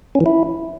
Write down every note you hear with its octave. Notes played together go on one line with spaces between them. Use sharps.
C#4
E3
E4